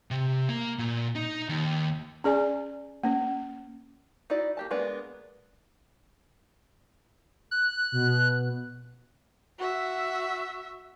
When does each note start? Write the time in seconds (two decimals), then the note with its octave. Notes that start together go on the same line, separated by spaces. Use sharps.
0.11 C3
0.49 A#3
0.79 A#2
1.15 D#4
1.49 D#2
2.24 C#4 G#4 D5 G#5
3.04 A#3 C#4
4.30 D#4 E4 F#4 D5
4.57 A#3 G4 A5
4.71 G#3 A#3 B3 D4
7.51 F#6
7.92 B2
9.58 F#4 E5